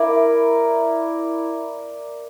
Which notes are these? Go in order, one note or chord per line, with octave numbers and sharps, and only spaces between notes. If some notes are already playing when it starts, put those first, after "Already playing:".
Already playing: E4 A#4 D5